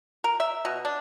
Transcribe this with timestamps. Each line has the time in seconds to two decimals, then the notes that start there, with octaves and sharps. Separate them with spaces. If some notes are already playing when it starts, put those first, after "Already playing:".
0.24 A#4
0.40 E5
0.65 B2
0.85 D4